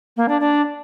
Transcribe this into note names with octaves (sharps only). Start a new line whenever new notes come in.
A#3
D4
D4